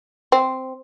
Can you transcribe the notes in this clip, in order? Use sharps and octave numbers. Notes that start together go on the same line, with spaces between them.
C4